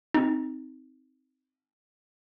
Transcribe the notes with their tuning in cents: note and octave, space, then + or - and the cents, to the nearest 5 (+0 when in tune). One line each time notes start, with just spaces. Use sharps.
C4 +0 D#4 +5